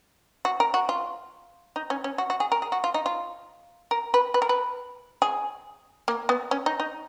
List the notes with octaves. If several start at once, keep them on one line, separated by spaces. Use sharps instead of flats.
F#4
A#4
F#4
F4
D#4
C#4
C#4
F#4
F#4
G#4
A#4
G#4
F#4
F4
D#4
F4
A#4
B4
B4
A#4
B4
G#4
A#3
B3
C#4
D#4
D#4